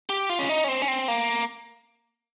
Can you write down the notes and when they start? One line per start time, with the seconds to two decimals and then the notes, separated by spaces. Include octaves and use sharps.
0.09 G4
0.29 F4
0.39 C#4
0.49 D#4
0.64 C#4
0.69 C4
0.82 C#4
0.88 C4
1.08 A#3